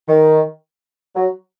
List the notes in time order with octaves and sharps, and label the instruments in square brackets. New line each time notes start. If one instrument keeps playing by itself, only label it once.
[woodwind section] D#3
F#3